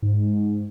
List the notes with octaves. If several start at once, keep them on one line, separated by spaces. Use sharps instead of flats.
G#2